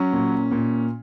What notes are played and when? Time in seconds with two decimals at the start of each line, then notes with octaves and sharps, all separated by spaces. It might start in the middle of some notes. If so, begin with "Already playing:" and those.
Already playing: F#3 C#4
0.13 A#2
0.52 A#2